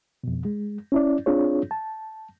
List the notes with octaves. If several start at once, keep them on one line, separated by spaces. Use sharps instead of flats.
F2 B2
G#3
C#4 E4 D5
C4 D4 F4 G#4 C#5
A5